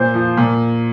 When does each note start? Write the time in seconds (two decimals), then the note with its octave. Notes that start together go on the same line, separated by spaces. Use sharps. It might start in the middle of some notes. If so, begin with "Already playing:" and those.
Already playing: A#2 C5
0.14 F3
0.37 A#2